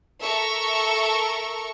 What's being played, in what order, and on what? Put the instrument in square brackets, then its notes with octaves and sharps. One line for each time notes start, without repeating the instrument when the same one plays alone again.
[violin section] A4 A#4 E5 C#6